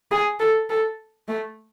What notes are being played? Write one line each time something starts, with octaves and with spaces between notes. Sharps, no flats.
G#4
A4
A4
A3